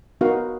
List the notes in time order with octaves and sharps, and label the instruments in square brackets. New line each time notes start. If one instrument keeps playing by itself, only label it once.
[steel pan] B3 D#4 F#4 A#4 F5